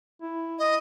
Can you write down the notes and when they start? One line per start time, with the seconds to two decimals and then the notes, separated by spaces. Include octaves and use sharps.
0.22 E4
0.59 D#5